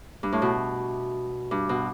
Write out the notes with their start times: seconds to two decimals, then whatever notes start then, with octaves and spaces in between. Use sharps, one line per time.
0.23 G2
0.32 A2
0.42 B2
1.51 G2
1.69 B2